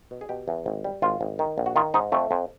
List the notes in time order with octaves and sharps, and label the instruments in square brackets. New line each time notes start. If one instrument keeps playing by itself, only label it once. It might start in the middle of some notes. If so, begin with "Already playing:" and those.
[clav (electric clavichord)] B2
G#4
B2 G4
E2
G#1
G3
G#1 F4
G#1
D#3
A#1
F#4
D#3 F4
G#2 D#4
F2 A3
F2